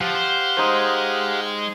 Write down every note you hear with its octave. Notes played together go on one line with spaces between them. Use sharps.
F3 G4 F5 F#5
C5
G#3 D#4 C5